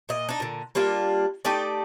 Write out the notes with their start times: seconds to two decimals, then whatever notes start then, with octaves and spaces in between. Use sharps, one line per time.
0.09 A#2 D#5
0.29 D4 D#4
0.40 A#2 D3
0.75 G3 A#3 D4 F4
1.45 A3 D#4 G4 D5